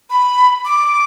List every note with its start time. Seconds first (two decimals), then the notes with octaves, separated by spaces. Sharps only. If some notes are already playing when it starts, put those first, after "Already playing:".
0.10 B5
0.65 D6